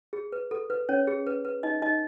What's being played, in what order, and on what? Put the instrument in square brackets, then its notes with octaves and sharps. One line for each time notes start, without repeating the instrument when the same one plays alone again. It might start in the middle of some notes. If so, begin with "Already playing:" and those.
[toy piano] G#4
B4
A4
B4
C#4 C#5
G#4
B4
B4
D#4 D#5
D#4 D#5